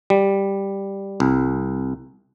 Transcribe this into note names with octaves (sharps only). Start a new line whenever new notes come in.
G3
C2